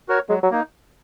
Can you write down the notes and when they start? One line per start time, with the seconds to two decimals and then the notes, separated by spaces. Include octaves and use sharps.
0.08 F#4 A#4 C#5
0.29 F#3 G#3
0.43 F#3
0.51 A#3 D#4